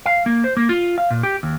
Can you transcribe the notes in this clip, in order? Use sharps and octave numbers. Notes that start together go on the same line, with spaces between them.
F5
A#3
C5
A#3
F4
F5
A#2
G4
D#2